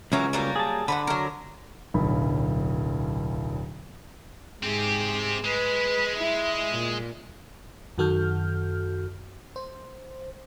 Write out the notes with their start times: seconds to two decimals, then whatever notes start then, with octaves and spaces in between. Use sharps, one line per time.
0.12 C#2 E3 F#3 A#3 C#4 C#5
0.33 F#3 G3 A#3
0.56 G#4 A5
0.88 D3 B4 D5 F#5
1.07 F#3 A#4
1.94 D1 B1 B5
4.63 G#2 C4 G4 G#4
5.44 G#3 B4
6.16 E4
6.72 A#2
7.98 F#2 D#3 F#4 A4 F6 G6
9.56 C5